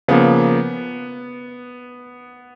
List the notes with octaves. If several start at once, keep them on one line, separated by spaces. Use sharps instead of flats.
C#3 F3 A#3 B3